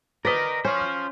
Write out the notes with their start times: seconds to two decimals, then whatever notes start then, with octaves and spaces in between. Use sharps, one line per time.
0.25 A#4 B4 D5 D#5 B6
0.65 C#4 F4 C5